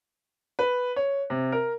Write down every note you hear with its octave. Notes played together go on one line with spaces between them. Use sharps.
B4
C#5
C3
A#4